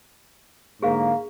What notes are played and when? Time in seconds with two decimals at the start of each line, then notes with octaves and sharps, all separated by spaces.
0.83 G#2 D3 A#3 G#4 F5